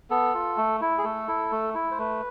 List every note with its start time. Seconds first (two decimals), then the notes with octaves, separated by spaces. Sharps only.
0.10 B3 A4
0.34 F4
0.57 A3
0.81 E4
0.98 G#4
1.04 A3 A4
1.28 E4
1.51 A3
1.75 E4
1.91 C5
1.98 A3 B4